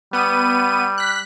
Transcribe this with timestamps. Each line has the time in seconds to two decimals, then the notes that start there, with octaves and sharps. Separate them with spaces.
0.13 G3 B3 D#7
0.98 F#6 B6